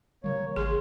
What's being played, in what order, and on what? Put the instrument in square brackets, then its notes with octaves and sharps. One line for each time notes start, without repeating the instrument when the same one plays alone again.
[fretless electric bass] C#3 E3 G3 [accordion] A#3 C#5
[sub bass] G#1 [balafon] G#4 [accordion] C6